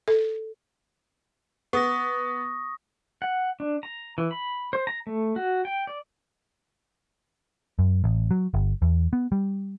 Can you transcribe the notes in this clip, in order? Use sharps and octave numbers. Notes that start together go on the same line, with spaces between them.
A4
B3 C#6 D#6 A#6
F#5
D4
A#5
E3
B5
C5
A#5
A3
F#4
G5
D5
F#2
A1
F#3
G1
E2
B3
G3